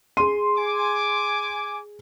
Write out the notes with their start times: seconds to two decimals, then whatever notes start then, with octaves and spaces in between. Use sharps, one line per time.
0.17 G#4 C6 D#7
0.57 G#5 D6